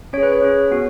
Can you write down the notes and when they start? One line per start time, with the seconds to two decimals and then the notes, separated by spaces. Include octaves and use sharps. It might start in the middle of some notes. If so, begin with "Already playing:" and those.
0.13 C#4 G#4 C#5
0.23 B4
0.32 C#5
0.42 C#4 G#4
0.71 B3 F#4